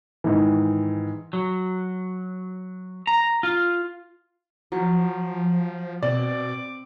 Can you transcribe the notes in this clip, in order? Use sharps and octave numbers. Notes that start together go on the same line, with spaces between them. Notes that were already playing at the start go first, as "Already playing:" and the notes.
G#2 D#3 E3
F#3
A#5
F4
F3 F#3
B2 C4 D5 D6